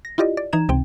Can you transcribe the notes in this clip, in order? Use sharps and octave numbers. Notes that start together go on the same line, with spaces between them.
A#6
E4 F4 G4 D5 D#5
D5
E3 D#4 A#5 G#6 E7
C#2 C3 C4 G5